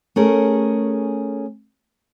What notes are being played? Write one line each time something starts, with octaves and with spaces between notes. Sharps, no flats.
A3 C#4 G#4 A#4